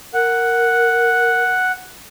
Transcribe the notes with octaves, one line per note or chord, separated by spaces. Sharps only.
A#4 F#5